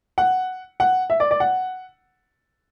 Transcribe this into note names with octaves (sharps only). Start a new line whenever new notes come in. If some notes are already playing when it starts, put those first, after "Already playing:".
F#5
F#5
E5
D5
D5
F#5